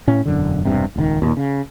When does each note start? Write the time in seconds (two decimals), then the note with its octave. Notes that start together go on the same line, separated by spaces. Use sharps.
0.07 A2 C#4
0.25 E1 F#2 D3
0.65 E1 G2 C3
0.96 D#1 C#2 B2 D#3
1.22 D#2 A#2
1.37 C#3